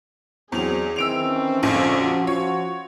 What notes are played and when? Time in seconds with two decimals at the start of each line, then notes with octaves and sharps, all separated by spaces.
0.52 E2 F#3 C4 D4 G#4 F7
0.96 D#3 E3 C4 E6 D7 F7
1.25 C#4
1.63 A#1 F2 G#2 D3 F3
1.98 F3 F#4
2.27 F3 F4 F#4 C#5